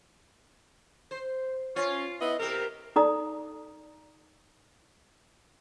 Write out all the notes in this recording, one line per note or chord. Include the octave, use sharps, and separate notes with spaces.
C5
C#4 F4
B3 E4 D#5
C3 G4 A#4
D#4 A4 D5 A#5 D#6